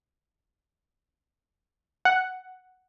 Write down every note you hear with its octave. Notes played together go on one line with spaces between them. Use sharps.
F#5